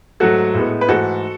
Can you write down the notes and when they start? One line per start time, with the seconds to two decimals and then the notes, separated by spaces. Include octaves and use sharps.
0.20 G#2 F#3 A3 F#4 A4
0.54 A2 G#3 B3
0.81 B4
0.88 G#2 E3 A3 F#4 A4